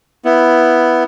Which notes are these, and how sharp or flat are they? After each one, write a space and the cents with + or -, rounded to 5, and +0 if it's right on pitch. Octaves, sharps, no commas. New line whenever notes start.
B3 +0 E4 +0